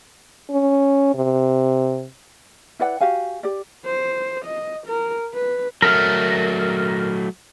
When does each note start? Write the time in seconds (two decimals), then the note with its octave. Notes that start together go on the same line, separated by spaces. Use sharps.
0.51 C#4
1.15 C3
2.79 E4 B4 D5 F#5
3.01 F#4 G4 F5 G#5
3.43 G4 D5
3.85 C5
4.45 D#5
4.87 A#4
5.34 B4
5.82 F#3 A3 A#4